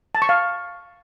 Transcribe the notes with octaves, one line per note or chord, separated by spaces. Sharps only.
A5
C#6
F5